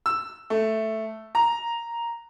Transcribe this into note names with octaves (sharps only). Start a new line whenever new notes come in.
E6
A3
A#5